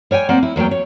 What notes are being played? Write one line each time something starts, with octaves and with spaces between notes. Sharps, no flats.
G3 C#5 G5 G#5
A#3 C4 D5 F#5
E4
E2 F#3 A#3 G5
C#5